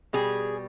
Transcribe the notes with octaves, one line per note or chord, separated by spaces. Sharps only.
B2 G3 G#4